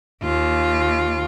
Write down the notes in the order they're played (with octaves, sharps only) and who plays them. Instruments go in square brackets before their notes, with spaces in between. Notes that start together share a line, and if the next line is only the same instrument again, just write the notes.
[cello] D#2 F4